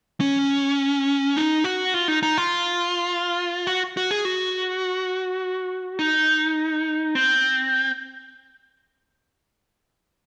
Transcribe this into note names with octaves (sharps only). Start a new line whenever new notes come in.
C#4
D#4
F#4
F4
D#4
D#4
F4
F#4
F#4
G#4
F#4
D#4
C4